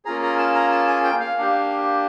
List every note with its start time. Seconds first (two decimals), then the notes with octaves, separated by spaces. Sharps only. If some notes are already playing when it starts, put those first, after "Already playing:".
0.05 A#3 C#4 F4 G#4 A#5
0.23 A#5
0.38 A5
0.55 A#5
0.72 A5
0.87 G#5
1.04 G5
1.20 F5
1.37 A#3 D4 G4